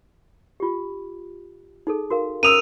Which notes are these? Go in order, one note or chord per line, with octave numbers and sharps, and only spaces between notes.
F4 G4
D#4 G#4 A4
F#4 A#4 F5
C#4 A#4 D#6 E6 D#7 F7